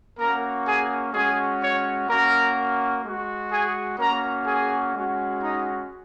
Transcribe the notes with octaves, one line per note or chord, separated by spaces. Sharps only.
A#3 C#4 F#4 A#4 A#5
G#4 G#5
G#3 C#4 F#4 G#4 G#5
C#5 C#6
A#3 C#4 F#4 A#4 A#5
G#3 F#4
G#4 G#5
A#3 C#4 F#4 A#4 A#5
G#4 G#5
G#3 C#4 F#4
D#4 D#5